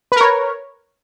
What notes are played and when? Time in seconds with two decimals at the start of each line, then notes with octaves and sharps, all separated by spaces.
0.12 B4
0.16 A#4
0.21 C#5